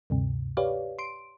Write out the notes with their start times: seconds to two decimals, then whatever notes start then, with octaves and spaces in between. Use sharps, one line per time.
0.10 D2 G2 C3
0.57 G4 B4 C#5 D5 F5
0.99 C6 D7